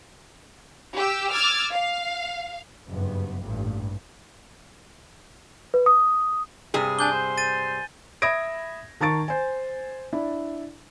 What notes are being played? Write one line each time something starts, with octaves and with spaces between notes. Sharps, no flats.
G4 G5 E6
D6 E6 F6 G#6 A6
F5
F#1 G2 B3
A1 G2 A#2
B4
D#6
G2 C3 G#4
D4 G#5 G6 G7
C5
A6 D#7
E5 B5 D#6 G#6 A#6 D7
D#3 A5 A#5 C#6 A6 D7
C5 G#5
D4 E4